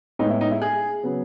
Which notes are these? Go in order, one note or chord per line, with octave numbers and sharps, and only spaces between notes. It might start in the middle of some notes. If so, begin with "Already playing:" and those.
A2 G#3 B3 D#4
E4
D#4
E4
G#4
C#3 F#3 B3